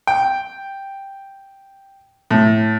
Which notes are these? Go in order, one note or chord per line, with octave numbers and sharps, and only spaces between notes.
G5
A2